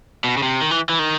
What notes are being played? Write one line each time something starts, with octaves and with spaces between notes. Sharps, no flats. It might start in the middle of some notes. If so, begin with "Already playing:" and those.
B2
C#3
C3
D#3
E3
E3
D#3